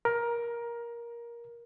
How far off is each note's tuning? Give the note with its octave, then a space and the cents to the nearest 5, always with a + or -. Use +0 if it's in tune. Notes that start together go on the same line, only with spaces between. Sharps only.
A#4 +15